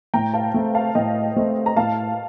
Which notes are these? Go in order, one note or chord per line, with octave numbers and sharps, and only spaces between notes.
A2 G5 A#5
F5 A5
A3 C4
F5 A5
A2 D#5 G5
A3 C4
A#5
A2 F5 A5